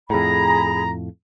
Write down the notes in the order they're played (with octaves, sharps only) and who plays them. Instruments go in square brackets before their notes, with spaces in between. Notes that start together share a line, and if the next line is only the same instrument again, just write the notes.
[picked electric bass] F2 A2 [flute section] G#4 B5 [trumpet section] A#5